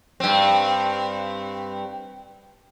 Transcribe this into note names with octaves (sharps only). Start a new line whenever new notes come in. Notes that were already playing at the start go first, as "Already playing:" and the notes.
G2 C4